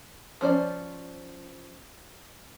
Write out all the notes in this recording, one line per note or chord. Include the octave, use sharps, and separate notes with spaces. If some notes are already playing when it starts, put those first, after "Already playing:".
F3 C#4 C5 D5